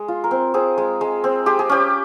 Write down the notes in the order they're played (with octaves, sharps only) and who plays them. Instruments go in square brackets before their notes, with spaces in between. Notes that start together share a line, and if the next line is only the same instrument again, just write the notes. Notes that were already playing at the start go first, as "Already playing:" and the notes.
Already playing: [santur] G#3
F4
A#4
C4
C4 G#4
G#3
G#3
C4
G#3 G4
G#4
C#4 G4